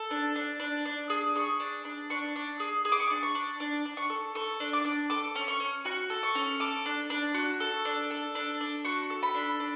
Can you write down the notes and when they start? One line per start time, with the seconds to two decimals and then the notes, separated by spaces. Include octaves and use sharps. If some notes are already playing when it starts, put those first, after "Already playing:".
Already playing: A4
0.11 D4
0.36 D4
0.60 D4
0.85 D4
1.10 G#4
1.36 G#4 C#6
1.60 D4
1.85 D4
2.10 D4 C#6
2.36 D4
2.60 G#4
2.85 G#4
2.92 D6
2.99 C#6
3.07 D6
3.10 D4
3.23 C#6
3.35 D4
3.60 D4
3.85 D4
3.97 C#6
4.10 A4
4.35 A4 C#6
4.60 D4
4.73 D6
4.85 D4
5.10 A4 D6
5.35 C#4
5.48 C#6
5.60 C#4
5.85 F#4 C#6
6.10 A4
6.23 C#6
6.35 C#4
6.60 A4 D6
6.86 D4
7.10 D4
7.34 F#4
7.60 A4
7.85 D4
8.11 A4
8.35 D4
8.61 D4
8.85 F#4 C#6
9.10 A4
9.23 B5
9.35 D4
9.60 D4